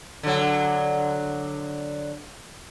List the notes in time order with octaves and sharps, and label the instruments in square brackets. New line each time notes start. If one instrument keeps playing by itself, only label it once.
[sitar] D3 F#3